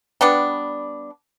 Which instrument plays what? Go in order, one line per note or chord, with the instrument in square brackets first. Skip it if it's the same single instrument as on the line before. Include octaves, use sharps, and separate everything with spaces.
[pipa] G3 B3 D4